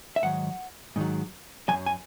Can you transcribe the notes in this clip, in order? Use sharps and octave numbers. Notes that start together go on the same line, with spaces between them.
E5
G#2 D#3 F#3 F#5
G#2 D#3 F#3
F#2 D#3 F#3 G#5
G#5